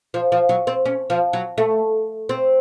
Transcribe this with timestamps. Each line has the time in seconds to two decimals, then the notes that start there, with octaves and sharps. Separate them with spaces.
0.14 F3
0.32 F3
0.49 F#3
0.67 C4
0.85 C#4
1.10 F3
1.33 F#3
1.58 A3
2.29 C4